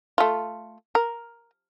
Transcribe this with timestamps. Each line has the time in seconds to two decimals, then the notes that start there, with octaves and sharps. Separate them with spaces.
0.18 A3 F4
0.95 A#4